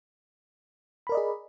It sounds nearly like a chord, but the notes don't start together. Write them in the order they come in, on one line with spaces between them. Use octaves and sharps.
B5 A#4 D5 D#5 G#4